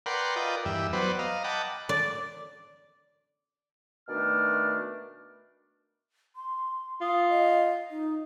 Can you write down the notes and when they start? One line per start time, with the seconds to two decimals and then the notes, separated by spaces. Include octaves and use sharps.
0.06 A#4 B4 D5 F#5 G5 C6
0.36 F4 A#4 B4 D5 D#5 G5
0.65 E2 G2 G4 E5
0.93 F#3 B3 B4 C5 D5
1.19 D#5 F5 A#5
1.44 D#5 F#5 G5 A5 B5 D6
1.89 D5
4.09 B2 D#3 A3 D4 D5 F6
6.36 C6
7.01 F4 D#6
7.30 D#5
7.90 D#4